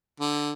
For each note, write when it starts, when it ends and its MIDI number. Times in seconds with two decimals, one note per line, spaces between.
0.20 0.52 50